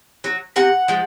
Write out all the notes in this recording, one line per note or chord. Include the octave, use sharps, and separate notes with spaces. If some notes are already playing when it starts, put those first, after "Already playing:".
F#3
C3 F#5
F3 G#3